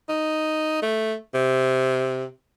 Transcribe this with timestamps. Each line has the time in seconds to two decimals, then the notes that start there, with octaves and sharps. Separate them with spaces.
0.09 D#4
0.82 A3
1.34 C3